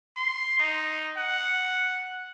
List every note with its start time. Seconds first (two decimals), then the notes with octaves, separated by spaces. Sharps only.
0.16 C6
0.59 D#4
1.17 F#5